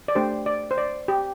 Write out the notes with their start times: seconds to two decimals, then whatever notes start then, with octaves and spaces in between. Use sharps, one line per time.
0.08 D5
0.15 A3 D4 G4 C5
0.46 D5
0.71 C5
0.78 D5
1.08 G4